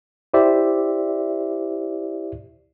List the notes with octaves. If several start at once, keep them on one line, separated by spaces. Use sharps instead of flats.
E4 G4 C5 D5 E5